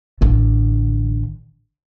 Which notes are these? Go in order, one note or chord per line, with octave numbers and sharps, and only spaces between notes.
A1 D3